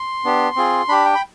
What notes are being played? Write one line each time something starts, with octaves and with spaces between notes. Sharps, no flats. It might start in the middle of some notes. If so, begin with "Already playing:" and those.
Already playing: C6
B3 D4 G4
C4 F4 G#4
D4 G4 B5
G5
B5